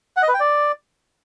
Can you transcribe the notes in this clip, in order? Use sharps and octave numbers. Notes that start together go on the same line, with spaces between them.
F#5
D#5
B4
G5
D5